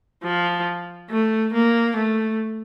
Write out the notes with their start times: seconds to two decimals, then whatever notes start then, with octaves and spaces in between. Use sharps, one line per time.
0.24 F3
1.10 A3
1.53 A#3
1.96 A3